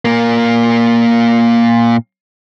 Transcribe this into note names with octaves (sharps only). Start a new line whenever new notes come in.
A#2 A#3